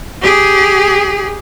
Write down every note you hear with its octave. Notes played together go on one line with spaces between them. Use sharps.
G4 G#4